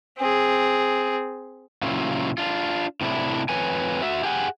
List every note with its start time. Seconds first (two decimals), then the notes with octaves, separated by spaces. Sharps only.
0.18 C4 G#4
1.82 A#2 C#3 F#3 C#4 E4 F4
2.38 D4 F4
3.01 A2 C3 D4 E4
3.49 F2 B4 C#5 G#5
4.02 F#4 E5
4.24 G4 G#4 F#5 G#5